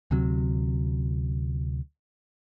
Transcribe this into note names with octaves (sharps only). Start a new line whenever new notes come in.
D2 C3 F#3